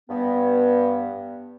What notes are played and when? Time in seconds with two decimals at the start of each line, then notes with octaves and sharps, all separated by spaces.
0.10 G2 B3